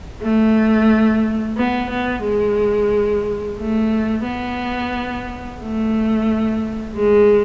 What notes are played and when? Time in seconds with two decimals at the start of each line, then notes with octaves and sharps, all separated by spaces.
0.21 A3
1.57 B3
1.90 B3
2.24 G#3
3.59 A3
4.26 B3
5.60 A3
6.96 G#3